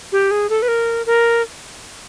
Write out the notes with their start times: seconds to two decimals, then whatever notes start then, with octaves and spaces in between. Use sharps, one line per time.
0.12 G4
0.31 G#4
0.49 A4
0.62 B4
0.68 A#4
1.06 A#4